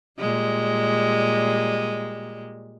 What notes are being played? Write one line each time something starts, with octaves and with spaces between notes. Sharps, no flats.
A#2 G3 G#3